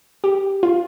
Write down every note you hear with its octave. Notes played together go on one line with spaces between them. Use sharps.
G4
F4